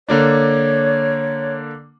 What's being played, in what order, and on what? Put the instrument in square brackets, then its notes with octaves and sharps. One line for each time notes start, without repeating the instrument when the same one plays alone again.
[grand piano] D3 A#3 D4 [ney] C#5